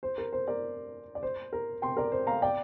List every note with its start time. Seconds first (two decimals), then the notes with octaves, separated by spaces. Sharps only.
0.03 C5
0.18 A#4
0.33 C5
0.48 A#4 D5
1.15 D5
1.23 C5
1.53 A#4
1.82 G5 C6
1.97 A#4 D5
2.12 C5
2.27 F5 A#5
2.42 D5 G5